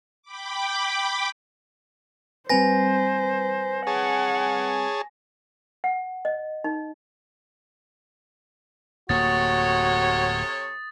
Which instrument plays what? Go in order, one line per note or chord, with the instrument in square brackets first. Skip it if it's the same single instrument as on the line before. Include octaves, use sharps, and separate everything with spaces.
[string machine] G5 B5 D6
[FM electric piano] G3 C4 B4 [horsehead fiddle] C5 [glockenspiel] G#5 A#6
[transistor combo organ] G#4 C#5 A5 [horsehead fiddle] F#5
[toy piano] F#5
D#5
D#4
[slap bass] D1 A#3 [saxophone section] C3 A4 C#5 [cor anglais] F#4 [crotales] D#6 A6